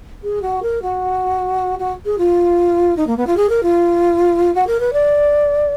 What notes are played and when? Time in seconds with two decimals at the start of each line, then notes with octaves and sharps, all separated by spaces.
0.23 G#4
0.42 F#4
0.63 A#4
0.82 F#4
1.79 F#4
2.06 G#4
2.18 F4
2.97 D#4
3.07 A#3
3.17 B3
3.27 F4
3.37 G#4
3.49 A#4
3.63 F4
4.55 F#4
4.67 A#4
4.80 B4
4.93 D5